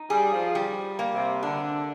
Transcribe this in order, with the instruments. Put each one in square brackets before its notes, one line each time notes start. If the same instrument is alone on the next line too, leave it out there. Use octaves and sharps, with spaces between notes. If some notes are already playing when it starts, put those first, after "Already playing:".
Already playing: [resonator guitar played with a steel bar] D#4
[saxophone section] G3 [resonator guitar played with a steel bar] G#4
[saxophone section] F3
[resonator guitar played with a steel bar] G3
A#3
[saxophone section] C3
[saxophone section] D3 [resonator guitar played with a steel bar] D4